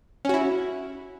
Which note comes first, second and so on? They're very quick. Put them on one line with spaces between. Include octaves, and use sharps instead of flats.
C#4 F#4 E4